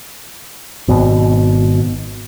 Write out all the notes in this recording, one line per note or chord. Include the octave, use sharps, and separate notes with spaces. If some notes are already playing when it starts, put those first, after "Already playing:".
G#1 B2